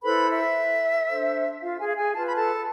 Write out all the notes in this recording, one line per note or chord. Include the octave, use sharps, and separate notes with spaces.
E4 A4 B4 C5 B5
E5
D4 A4 C5
F4 F5
G#4 G#5
F5
G#4 G#5
F4 B4 A5
B5
A4 A5